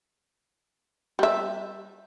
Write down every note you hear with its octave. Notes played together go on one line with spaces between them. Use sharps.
G3 E5